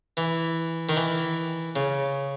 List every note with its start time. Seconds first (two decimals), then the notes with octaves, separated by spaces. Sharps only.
0.17 E3
0.89 D#3
0.96 E3
1.76 C#3